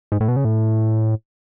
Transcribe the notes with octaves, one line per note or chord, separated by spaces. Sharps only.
G#2
A2
B2
C#3
A2